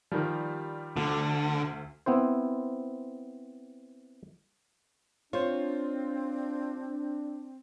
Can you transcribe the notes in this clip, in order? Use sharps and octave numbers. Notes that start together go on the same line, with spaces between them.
D#3 F3 G3
D2 D3
B3 C4 E4 C5
C4 D4 F4 C5 C#5